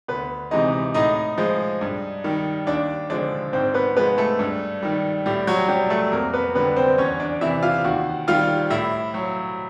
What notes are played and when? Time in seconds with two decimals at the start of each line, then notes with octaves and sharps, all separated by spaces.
0.08 D2 B3 B4
0.51 C3 E3 G#3 D#4 D#5
0.94 A2 D#4 D#5
1.38 F3 G#3
1.81 G2
2.24 D#3 G3
2.67 D#2 D4 D5
3.10 D3 F3 G#3 D4 D5
3.53 G#2 C4 C5
3.74 B3 B4
3.96 F3 G#3 B3 B4
4.18 A3 A4
4.39 G2
4.83 D#3 G3
5.26 A2 G3 G4
5.47 F#3 F#4
5.69 F#3 G3 G4
5.90 A3 A4
6.12 F2 A#3 A#4
6.33 B3 B4
6.55 D3 G3 B3 B4
6.76 C4 C5
6.98 E2 C#4 C#5
7.20 D4 D5
7.41 C3 E3 E4 E5
7.63 F4 F5
7.85 D#2 F#4 F#5
8.28 D#3 G3 F4 F5
8.70 A2 E4 E5
9.14 F#3